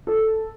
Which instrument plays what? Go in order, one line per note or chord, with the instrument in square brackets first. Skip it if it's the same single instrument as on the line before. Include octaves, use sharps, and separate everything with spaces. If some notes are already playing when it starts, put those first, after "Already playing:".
[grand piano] A4